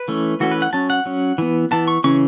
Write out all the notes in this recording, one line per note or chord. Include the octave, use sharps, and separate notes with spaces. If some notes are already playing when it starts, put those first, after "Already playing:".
Already playing: B4
E3 A3 C#4
E3 A3 C#4 F#4
B4
F#5
F#3 C#4 A5
F#5
F#3 C#4
E3 B3
E3 B3 A5
C#6
C#3 E3 C#4 C#6